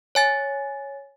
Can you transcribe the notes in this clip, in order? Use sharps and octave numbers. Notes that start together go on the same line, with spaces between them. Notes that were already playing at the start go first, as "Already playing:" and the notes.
C#5 G#5 A6